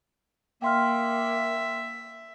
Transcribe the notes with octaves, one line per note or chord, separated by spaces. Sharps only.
A#3 E5 G5 C6 F6